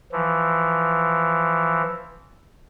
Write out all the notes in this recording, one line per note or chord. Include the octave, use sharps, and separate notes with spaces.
E3 F3